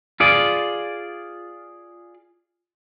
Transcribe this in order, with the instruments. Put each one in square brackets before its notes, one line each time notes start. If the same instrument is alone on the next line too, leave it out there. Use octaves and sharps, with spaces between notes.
[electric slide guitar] F4 G#4 D5